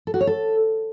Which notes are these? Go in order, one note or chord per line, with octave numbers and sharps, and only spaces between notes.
A4
F#4
C#5
A4